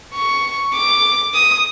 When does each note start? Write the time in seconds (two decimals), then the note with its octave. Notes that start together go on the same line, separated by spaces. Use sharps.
0.14 C#6
0.74 D6
1.34 D#6